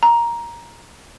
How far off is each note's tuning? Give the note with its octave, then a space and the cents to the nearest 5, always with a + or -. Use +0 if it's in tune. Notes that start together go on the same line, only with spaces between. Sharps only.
A#5 +10